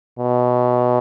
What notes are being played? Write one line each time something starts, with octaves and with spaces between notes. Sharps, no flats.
B2